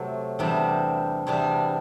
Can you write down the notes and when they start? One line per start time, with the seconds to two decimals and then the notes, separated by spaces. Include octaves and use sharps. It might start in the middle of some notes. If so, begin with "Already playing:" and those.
Already playing: C3 F#3 A3
0.39 E2 C3 G3 B3 D4
1.27 E2 C3 G3 B3 D4